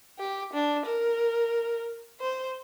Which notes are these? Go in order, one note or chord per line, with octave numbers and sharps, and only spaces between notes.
G4
D4
A#4
C5